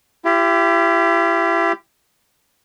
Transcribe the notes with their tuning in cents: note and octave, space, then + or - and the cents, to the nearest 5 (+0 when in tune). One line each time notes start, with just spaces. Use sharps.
E4 +40 G4 +0